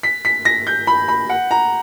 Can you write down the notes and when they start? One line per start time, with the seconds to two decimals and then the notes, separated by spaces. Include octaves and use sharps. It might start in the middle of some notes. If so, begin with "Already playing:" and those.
0.03 B6
0.25 B6
0.45 A#6
0.67 G6
0.87 B5
1.08 B5
1.30 F#5
1.51 A#5